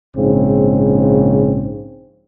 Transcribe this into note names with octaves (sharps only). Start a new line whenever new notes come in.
A#1 G#2 C#3 C4